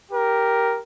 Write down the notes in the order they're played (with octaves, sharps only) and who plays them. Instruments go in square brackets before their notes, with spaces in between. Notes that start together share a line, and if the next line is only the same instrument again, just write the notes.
[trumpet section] G4 A#4